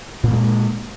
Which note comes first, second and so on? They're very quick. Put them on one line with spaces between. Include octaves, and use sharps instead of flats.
A#2 A#3 G#3